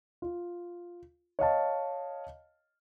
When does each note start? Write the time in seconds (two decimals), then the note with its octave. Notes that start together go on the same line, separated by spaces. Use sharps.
0.22 F4
1.39 C#5 D#5 F5 A5